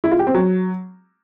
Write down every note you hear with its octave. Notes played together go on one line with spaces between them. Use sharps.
E4
F4
G4
C4
F#3